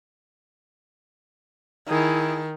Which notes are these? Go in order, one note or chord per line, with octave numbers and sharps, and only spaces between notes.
D#3 E4 G#4